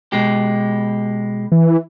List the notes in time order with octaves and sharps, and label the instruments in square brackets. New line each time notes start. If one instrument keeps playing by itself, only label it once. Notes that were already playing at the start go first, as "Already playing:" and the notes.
[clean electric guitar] B2 G#3 G4
[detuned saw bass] E3